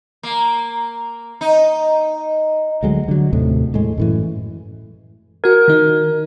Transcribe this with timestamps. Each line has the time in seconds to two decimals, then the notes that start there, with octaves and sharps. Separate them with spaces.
0.23 A#3
1.41 D#4
2.83 D2 F#3 G#3
3.08 D3 F#3
3.33 D#2 A2 C3
3.74 A2 G#3
3.97 F#2 A2 E3
5.44 F#4 A#4 G#6
5.68 D#3 D#4